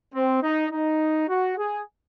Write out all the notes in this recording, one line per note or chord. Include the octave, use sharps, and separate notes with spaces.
C4
D#4
D#4
F#4
G#4